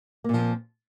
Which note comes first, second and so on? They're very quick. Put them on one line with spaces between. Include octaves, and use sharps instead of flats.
A#3 A#2 F3 C4